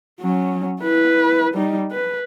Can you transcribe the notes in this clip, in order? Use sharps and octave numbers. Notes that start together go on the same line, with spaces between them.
F#3 C#4
E4 B4
G3 D#4
B4